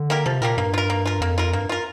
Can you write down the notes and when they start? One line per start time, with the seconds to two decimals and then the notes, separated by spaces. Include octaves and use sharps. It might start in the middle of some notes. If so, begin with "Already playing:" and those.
Already playing: D3
0.10 A#3 G4 A#4
0.26 C3 F3
0.41 A#2 A#3 G4 A#4
0.57 G2 A#3
0.74 F4 A#4
0.90 A#3
1.05 F4 A#4
1.21 F2 A#3
1.38 F4 A#4
1.53 G2 A#3
1.69 F4 A#4